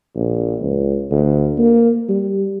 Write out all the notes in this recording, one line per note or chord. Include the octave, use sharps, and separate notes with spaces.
A#1
C#2
D2
A#3
G3